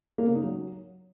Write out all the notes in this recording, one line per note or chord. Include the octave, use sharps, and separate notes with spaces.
A#3
C#3
D#4
F#3